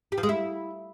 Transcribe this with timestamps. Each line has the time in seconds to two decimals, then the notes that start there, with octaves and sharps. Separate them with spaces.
0.12 G4
0.18 F3
0.23 G#3
0.29 E4